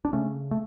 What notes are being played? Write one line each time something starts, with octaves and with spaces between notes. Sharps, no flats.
D4
C#3 A3 C#4
A3